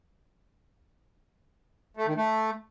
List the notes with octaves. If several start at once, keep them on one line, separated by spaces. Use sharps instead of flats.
A3
D#3
A3